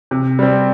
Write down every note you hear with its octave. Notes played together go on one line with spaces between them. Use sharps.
C3
G3 C4